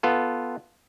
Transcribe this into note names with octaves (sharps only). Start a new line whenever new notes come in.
B3 F4 A4